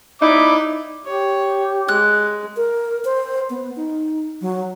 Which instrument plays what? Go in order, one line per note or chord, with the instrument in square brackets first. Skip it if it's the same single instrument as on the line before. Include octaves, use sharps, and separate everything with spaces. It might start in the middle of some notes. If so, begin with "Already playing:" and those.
[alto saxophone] D#4 [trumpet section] E4 D5 D6
[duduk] G4 [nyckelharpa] C#5
[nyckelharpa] G#3 [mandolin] F#6
[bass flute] A#4
C5
B3
D#4
F#3